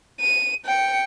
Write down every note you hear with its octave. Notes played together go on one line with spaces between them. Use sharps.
D#7
G5 C#7